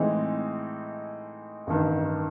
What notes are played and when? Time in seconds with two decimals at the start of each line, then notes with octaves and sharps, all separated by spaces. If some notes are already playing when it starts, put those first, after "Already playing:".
Already playing: A2 E3 G#3 C4 D#4
1.67 A1 G2 D#3